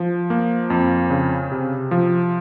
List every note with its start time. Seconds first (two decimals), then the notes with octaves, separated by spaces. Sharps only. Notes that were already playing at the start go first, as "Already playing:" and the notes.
Already playing: F3
0.30 A#3
0.70 F2
1.10 C#3
1.52 C3
1.91 F3